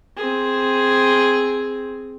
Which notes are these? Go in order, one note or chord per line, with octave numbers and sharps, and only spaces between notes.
C4 G#4